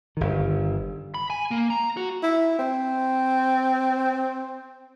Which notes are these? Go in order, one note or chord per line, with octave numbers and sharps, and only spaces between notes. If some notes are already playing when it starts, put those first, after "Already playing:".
G1 D#3
B5
G#5
A#3
A#5
F#4
E4
C4